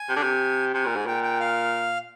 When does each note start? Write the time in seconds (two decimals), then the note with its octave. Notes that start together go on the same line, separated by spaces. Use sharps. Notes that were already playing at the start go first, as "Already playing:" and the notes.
Already playing: G#5
0.09 C3
0.16 D3
0.23 C3
0.74 C3 G#5
0.85 A#2
0.96 G#2
1.07 A#2 G5
1.23 G5
1.40 F5